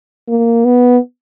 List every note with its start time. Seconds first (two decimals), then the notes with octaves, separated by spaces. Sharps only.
0.28 A#3
0.65 B3